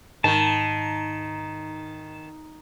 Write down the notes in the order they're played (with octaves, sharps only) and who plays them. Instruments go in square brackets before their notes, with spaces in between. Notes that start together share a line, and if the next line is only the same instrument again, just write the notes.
[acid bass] G#2 [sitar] D#3 [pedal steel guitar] A5